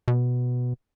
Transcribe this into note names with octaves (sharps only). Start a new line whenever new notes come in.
B2